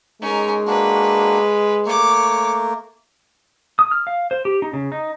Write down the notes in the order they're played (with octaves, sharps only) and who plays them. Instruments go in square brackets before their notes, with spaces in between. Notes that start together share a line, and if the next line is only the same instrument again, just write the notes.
[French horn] G#3 [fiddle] C#4 A#4 [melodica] D#4
[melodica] A#3 D4 F#4 [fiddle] B4
[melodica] A3 A#3 [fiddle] C#5 D6
[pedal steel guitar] D#6
F6
F5
C5
G4
D#4
C#3
D#4